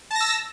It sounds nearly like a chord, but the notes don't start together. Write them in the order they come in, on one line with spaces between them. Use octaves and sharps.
A5 A#6 E6